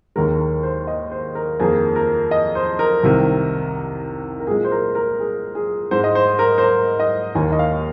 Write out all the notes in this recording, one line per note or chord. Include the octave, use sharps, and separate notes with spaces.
D#2 D#3 G#3 A#4
A#4
C5
D#5
C5
A#4
F2 D#3 A#3 G#4
A#4
D#5
C5
A#4
C2 C3 D#3
A#4
A#2 G#3 G#4
C5
A#4
A#4
G#4
G#4
G#2 G#3 C5
D#5
C5
A#4
C5
A#4
D#5
D#2 D#3 A#3 G#5
D#5
F5